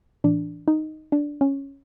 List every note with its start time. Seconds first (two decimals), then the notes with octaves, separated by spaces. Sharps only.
0.24 A2 E3 D4
0.68 D#4
1.12 D4
1.41 C#4